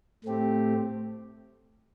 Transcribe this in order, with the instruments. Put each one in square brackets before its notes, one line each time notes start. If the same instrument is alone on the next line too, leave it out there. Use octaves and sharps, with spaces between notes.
[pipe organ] A2 A3 C4 G4